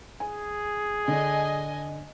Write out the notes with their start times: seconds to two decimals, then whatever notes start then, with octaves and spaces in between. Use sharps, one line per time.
0.20 G#4 G#5
1.08 D3 D4 D#5 G#5